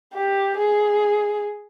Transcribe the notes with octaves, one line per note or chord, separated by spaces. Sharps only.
G4
G#4